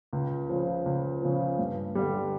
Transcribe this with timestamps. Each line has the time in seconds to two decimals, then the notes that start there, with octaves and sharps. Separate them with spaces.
0.13 C#2
0.49 C#3 F3
0.86 C#2
1.22 C#3 F3
1.59 G2
1.95 D3 G3